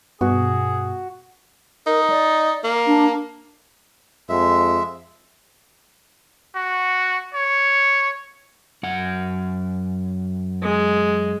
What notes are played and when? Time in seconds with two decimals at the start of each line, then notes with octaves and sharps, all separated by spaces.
0.21 G2 B2 F#4 G#4
1.87 D#4 A#4
2.10 D5
2.64 A#3
2.87 D4
4.29 F2 G#3 E5
6.56 F#4
7.34 C#5
8.83 F#2 F#5
10.62 G#3